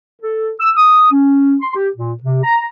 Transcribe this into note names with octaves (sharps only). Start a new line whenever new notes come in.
A4
E6
D#6
C#4
C6
G4
A#2
C3
A#5